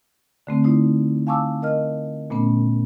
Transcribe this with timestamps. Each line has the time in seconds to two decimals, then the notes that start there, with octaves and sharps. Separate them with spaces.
0.47 D3 A3 C4
0.64 A3 D#4 E4
1.27 F5 G#5 A5 C#6 D6 E6
1.62 A#4 D#5 F6
2.30 A#2 A3 B3 C#4